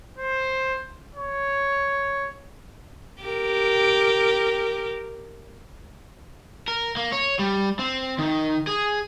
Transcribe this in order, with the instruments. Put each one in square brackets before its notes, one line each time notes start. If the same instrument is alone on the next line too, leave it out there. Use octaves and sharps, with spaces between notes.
[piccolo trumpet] C5
C#5
[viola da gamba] G4 A#4
[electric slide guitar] A#4
A#3
C#5
G3
C4
D#3
G#4